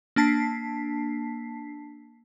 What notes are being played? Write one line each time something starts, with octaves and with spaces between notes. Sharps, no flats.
A#3 D4 A5 B6 C7